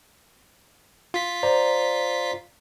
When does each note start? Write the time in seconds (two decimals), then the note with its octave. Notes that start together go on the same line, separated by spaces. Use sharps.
1.14 F4 B6
1.43 C5 D5 A#5